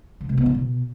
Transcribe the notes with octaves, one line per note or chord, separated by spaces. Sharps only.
D3
C3
B3
D3
B2